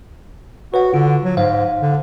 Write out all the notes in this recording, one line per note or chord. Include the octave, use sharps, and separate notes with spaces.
F#4 B4 C#5 F#5
D3 F4
F#3
G#2 C5 F5
D3